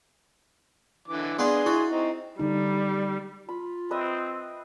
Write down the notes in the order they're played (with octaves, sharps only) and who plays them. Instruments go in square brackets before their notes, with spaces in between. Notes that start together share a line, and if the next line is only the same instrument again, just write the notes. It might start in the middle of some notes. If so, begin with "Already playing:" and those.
[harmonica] D3 E3 D6
[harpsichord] B3 D4 F4 [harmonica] G#4 C6
[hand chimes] E4 [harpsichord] F#4
[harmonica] C4 D#4
[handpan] D3 D#4 [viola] G3
[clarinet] F4 [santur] B5
[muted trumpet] C4 [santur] B4 D#5 E5